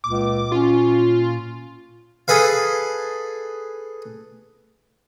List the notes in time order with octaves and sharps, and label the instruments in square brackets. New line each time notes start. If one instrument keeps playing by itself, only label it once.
[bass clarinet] C#2 [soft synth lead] A#2 [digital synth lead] D6
[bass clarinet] C#4 [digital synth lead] F4
[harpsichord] G#4 A4 B4 F5